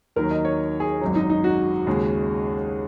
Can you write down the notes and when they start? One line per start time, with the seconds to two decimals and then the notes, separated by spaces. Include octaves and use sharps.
0.16 D#2 D#3 F#3 A#4
0.31 D#5
0.45 C#5
0.80 G#4
1.01 G#1 F#2 F#3
1.15 D#4
1.30 D#4
1.44 F#4
1.87 D#2 C#3 G#3